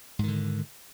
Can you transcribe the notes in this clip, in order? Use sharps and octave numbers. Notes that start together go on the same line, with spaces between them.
G#2 D3 D#3